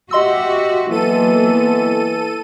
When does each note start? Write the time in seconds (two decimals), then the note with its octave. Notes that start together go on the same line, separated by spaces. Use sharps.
0.11 F#4 G4 D#5 E5 C6 E6
0.91 E3 F#3 A#3 B3 A4 D#7